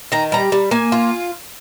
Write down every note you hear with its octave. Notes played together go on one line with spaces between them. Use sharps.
D#3 A#5
G3 A#5
G3
A#3 G#5
F4